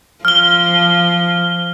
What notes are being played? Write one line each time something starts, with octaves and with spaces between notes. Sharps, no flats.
F3 F6 G7